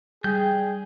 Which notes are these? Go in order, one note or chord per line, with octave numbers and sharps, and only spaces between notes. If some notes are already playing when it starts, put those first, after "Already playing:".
G3 G#4 G5 G6